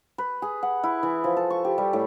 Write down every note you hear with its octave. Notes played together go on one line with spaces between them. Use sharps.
B4
G#4
F#5
E4
E3
F3
A4
C#6
G4
G3
A2